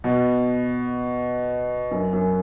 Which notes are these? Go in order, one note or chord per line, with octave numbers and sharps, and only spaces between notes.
B2
F#2
F#2